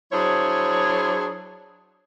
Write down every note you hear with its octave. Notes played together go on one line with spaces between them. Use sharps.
F#3 D4 E4 G#4 C5 C#5